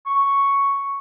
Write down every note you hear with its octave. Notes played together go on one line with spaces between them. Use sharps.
C#6